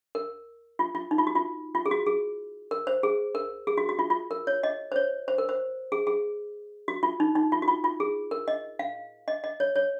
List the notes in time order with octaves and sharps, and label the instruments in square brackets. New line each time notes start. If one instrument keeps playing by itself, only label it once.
[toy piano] A#4
F4
F4
D#4
F4
F#4
F4
F4
G#4
F#4
G#4
A#4
C5
G#4
A#4
G#4
F#4
F#4
F4
F4
A#4
C#5
D#5
C5
C#5
C5
A#4
C5
G#4
G#4
F#4
F4
D#4
D#4
F4
F#4
F4
F4
G#4
A#4
D#5
F5
D#5
D#5
C#5
C#5